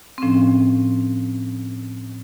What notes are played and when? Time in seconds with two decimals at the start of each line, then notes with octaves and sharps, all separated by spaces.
0.18 C4
0.22 A2 F3 C#4